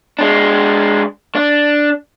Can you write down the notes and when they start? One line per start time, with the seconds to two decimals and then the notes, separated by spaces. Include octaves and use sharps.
0.19 G#3 D4
1.35 D4